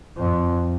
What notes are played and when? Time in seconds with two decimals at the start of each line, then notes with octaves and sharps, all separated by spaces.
0.17 F2